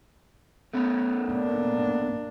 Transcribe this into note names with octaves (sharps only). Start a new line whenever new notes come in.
A3 B3 C#4
A#3 D4